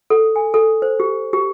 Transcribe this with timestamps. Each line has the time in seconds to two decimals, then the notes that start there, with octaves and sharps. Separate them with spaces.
0.10 A4
0.36 G#5
0.54 A4
0.82 C5
1.00 G4
1.33 G4